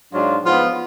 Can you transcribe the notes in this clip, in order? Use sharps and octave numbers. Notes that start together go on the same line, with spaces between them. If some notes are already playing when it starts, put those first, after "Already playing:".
G#2 F#3 D4 F4
G#2 F3 B3 F4